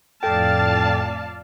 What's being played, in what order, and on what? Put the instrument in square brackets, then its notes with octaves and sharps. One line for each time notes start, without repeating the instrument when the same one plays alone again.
[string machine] F2 A2 [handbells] A4 G5 [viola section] D5 F5 A5